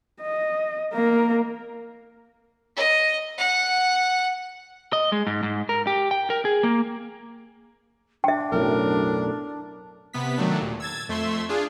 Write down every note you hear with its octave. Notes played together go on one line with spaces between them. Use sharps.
D#5
A#3 A#4
D#5
F#5
D#5
G#3
G#2
G#2
A#4
G4
G5
A#4
G#4
A#3
D4 E5 G5
B1 F#2 A2 A#4
C3 B3 B6
D#3 F#3 A3 D4
D#2 A#2
E6 G#6 A6
F2 A3 E5 C6 E6
D4 F4 G#4